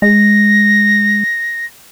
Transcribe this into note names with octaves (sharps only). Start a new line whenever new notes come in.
G#3 A#6